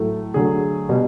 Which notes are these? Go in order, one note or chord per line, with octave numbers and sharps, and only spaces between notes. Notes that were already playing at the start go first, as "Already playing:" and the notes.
Already playing: A2 F#3 A3
D3 F#3 A3 G#4
B2 G3